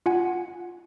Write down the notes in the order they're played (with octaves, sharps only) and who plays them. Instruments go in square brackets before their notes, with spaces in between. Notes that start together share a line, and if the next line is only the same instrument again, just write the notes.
[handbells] F4 F#5 G#5